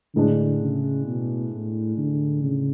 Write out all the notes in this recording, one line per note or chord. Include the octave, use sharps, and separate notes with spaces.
A2 D3 G#3 D4
C#3
B2
A2
D3
C#3